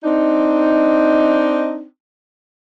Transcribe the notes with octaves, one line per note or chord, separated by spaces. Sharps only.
C4 D4 D#4